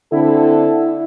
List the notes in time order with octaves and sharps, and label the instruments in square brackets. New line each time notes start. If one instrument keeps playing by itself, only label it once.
[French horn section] D3 C4 [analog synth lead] E4 [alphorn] A4